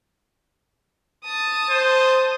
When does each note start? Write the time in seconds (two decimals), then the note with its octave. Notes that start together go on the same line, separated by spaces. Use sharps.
1.25 A5 D#6
1.70 C5